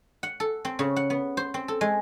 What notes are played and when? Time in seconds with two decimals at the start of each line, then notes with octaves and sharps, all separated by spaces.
0.23 F#5
0.40 A4
0.65 C4
0.79 C#3
0.96 F#5
1.10 B3
1.37 C5
1.54 C4
1.68 A4
1.81 G#3